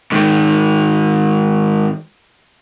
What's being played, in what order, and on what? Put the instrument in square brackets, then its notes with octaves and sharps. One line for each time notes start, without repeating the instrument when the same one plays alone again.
[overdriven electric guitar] G#2 D#3